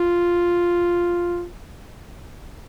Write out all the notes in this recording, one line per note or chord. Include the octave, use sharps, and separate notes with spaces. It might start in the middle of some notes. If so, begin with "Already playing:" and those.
Already playing: F4